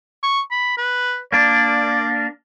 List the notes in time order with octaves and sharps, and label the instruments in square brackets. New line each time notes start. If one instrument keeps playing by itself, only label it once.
[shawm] C#6
B5
B4
[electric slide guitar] A#3 D4 [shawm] D5